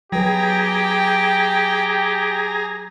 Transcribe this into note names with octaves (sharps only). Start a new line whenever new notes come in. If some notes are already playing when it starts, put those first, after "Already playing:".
F#3 G4 G#4 B4 G5 A#5